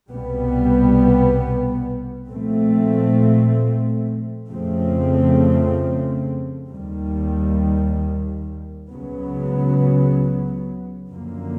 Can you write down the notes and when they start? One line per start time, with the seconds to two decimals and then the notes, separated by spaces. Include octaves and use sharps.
0.11 C2 B2 G3 B3
2.31 A#2 F3 A3 C4
4.50 F2 C#3 F3 A3 C4
6.70 D#2 D#3 G3
8.90 C#2 C#3 F#3 B3
11.10 F#2 D3 F3 A#3